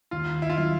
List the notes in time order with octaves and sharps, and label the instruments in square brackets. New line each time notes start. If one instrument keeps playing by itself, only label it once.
[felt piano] D#2 [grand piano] F4
[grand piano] E4
F4
[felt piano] D#3 F#3 [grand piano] E4